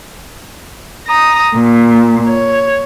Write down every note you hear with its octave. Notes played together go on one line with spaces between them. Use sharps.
A#5 D#6
A#2
C#5